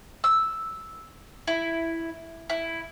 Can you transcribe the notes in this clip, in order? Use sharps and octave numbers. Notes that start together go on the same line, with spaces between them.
E6
E4
E4